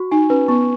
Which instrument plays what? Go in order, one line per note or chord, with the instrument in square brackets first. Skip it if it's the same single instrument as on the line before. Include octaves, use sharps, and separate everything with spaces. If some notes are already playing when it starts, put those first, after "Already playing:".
Already playing: [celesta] F#4 C#6
[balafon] D#4 [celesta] G#5
[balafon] C#4 [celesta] B4
[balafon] B3 [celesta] C#6